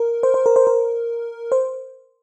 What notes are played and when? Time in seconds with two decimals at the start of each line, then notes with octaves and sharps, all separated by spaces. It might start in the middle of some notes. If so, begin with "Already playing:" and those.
Already playing: A#4
0.23 C5
0.34 C5
0.46 A#4
0.56 C5
0.67 A#4
1.52 C5